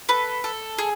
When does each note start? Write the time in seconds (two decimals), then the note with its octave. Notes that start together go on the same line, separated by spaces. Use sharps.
0.09 A4 B4
0.44 A4
0.78 G#4